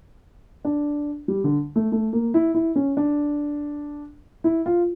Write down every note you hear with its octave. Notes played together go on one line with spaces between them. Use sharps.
D4
G3
D3
A3
A3
A#3
E4
E4
C#4
D4
E4
F4